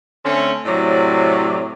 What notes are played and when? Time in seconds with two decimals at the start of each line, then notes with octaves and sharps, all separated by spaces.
0.25 D3 A3 C4 C#4
0.65 A2 C3 F#3 D5